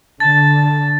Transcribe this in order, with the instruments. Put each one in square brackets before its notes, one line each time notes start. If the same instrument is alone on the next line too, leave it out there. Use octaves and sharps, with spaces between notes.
[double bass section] D3 [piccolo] A5 [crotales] A6